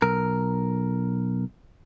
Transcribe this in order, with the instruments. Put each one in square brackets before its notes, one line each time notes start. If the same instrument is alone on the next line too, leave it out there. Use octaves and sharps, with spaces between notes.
[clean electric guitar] B1 A#4